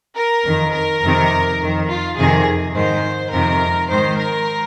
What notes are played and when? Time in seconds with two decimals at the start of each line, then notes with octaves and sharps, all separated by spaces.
0.15 A#4
0.44 F2 D#3
0.73 A#4
1.01 F2 C3 D#3
1.59 F2 D#3
1.89 F4
2.17 F2 C3 D#3 G#4
2.75 G#2 D#3 C5
3.32 F2 C3 D#3 A#4
3.90 G#2 D#3 C5
4.19 A#4